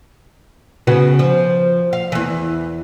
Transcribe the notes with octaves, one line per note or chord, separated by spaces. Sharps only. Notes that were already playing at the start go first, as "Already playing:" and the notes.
C#3 B3 F#4
F3
F5
E2 E3